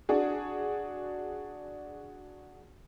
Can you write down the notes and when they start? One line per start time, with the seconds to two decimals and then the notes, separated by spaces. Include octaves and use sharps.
0.09 D4 F#4 G#4